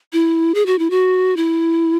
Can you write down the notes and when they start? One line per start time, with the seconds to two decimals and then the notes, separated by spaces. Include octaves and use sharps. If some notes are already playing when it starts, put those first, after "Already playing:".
0.13 E4
0.54 G#4
0.66 F#4
0.79 E4
0.90 F#4
1.37 E4